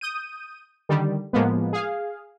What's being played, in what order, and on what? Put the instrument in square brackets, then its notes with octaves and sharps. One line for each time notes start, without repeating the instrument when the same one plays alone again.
[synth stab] D#6 G6 D#7
D3 D#3 G3
A2 F3 G#3 A#3 B3
G#4 F5